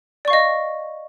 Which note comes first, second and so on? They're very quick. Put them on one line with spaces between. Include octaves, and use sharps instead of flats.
D5 C#6 F5 D#5